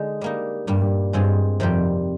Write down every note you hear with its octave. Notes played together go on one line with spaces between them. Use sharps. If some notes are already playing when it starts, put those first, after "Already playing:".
Already playing: D3 G#3 D#4
G3 A#3 D#4
G2 A#2 G3 A#3
G2 G#3 C4 F4 G#4
F2 C3 D#3 G3 C4 G4